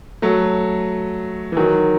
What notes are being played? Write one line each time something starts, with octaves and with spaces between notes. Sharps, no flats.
F#3 A3
E3
D#3 F#3